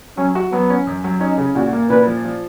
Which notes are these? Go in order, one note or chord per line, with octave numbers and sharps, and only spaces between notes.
F#3 C#4
F#4
F#3 B3
C#4
F#2
F#3
C#4 D#4
C#3
A#2 F#4
A#3
A#2 B4
F3
F3